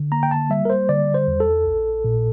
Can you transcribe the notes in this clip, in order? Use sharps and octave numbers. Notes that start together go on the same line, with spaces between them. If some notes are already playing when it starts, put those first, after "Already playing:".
Already playing: D3
A#3 A#5
G5
A5
G3 E5
A#4
C5
D3 D5
C5
E2
A4
A#1
A#2